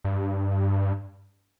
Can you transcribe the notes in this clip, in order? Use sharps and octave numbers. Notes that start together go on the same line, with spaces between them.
G2